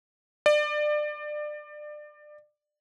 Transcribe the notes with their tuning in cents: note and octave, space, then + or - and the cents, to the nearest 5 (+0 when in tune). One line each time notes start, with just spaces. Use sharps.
D5 +25